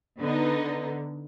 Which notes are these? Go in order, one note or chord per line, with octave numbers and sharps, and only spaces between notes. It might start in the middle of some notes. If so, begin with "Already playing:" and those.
D3 B3 D#4